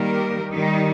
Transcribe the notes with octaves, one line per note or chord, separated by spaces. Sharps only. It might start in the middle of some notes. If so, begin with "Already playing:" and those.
Already playing: D#3 G3 A#3 G4 A#4
D#3 G3 D#4